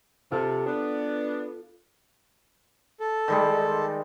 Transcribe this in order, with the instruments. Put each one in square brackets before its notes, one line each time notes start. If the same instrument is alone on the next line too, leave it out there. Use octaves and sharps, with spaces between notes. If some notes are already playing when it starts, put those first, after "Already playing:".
[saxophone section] C3 [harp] F4 A4
[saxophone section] B3 D4
[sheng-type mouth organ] A4
[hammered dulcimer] D#3 G3 G#3